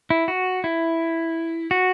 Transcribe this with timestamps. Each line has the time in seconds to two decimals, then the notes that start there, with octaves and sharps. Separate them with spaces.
0.10 E4
0.28 F#4
0.64 E4
1.71 F#4